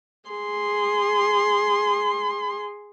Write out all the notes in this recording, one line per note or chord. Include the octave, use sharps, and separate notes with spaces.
G#4 C6